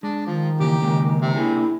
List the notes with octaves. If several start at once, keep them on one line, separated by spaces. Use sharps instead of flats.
G#3 D4
D#3 F3
C#3 E3 A#3 G4
C#3 G#3 A#3
C3
A#3 D4 E4 G#4